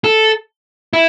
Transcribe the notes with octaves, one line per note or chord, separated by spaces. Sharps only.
A4
E4